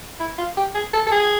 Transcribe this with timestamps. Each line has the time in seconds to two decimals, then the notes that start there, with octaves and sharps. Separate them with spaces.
0.20 E4
0.38 F4
0.57 G4
0.75 G#4
0.93 A4
1.07 A4
1.12 G#4